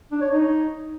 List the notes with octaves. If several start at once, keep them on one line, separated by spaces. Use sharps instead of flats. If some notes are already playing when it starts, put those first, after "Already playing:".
D4
C#5
D#4